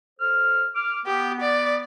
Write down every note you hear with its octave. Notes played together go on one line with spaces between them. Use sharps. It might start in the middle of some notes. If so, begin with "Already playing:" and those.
A4 C5 F6
D6 F6
B3 G4
D5